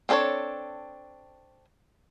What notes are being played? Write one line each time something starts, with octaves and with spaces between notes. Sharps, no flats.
C4 D4 A4 B4 C#5